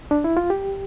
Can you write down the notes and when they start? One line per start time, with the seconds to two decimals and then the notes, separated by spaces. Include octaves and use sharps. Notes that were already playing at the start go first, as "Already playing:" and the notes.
0.11 D4
0.24 E4
0.37 F4
0.50 G4